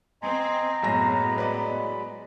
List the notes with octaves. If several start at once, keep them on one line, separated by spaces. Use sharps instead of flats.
C4 D#5 G#5 A#5 C6
F#1 F#2 A2 F#3 G#3 B3 B5 A#6
B4 D5 D#5